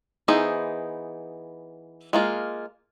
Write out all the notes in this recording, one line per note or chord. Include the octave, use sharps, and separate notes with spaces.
E3 B3 D#4 G#4 C5
G#3 A#3 F4